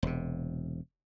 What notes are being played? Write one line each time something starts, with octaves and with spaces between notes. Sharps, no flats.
E1 C3